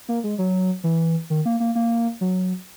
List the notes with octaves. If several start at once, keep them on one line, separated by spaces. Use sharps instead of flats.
A#3
G#3
F#3
E3
D#3
A#3
A#3
A#3
F#3